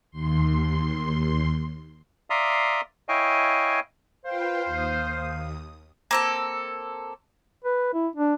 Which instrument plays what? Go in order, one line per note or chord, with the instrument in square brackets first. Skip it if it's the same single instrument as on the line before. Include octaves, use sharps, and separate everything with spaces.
[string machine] D#2 C6
[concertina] D5 E5 F5 A#5 C6 D#6
E4 C#5 D#5 F5 G5 G#5
[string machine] F4 B4 G5 [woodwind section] C5 F5
[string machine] D#2 D#6
[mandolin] A#3 C4 A4
[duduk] B4
E4
D4